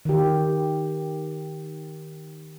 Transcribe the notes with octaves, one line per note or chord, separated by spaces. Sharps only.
D#3 G4